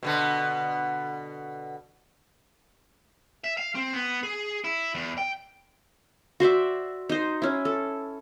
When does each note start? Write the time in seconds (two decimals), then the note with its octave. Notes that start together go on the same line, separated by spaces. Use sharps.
0.03 B2 D3 B3
3.44 E5
3.57 F5
3.75 C4
3.93 B3
4.23 G#4
4.64 E4
4.94 E2
5.18 G5
6.40 F#4 C5 D5 E5
7.09 D#4 C5
7.42 C#4 E4
7.65 A4